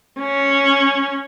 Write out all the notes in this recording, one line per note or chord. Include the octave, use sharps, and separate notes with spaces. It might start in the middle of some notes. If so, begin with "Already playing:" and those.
C#4